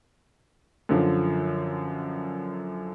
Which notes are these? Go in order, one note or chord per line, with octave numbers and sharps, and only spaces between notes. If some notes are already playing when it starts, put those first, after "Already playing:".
F#2 D3 F3